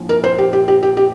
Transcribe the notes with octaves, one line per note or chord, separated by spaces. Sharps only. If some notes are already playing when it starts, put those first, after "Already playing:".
Already playing: A#1 A2 F3
A#4
C5
G4
G4
G4
G4
G4